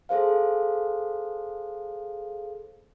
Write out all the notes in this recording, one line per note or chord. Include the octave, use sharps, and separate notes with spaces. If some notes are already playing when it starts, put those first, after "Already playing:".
G#4 A4 C5 F5